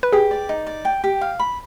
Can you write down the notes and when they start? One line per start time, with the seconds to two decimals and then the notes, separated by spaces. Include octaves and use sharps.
0.03 B4
0.13 G4 G#4
0.31 D5
0.49 D#4
0.67 D5
0.85 G5
1.04 G4
1.21 F5
1.39 B5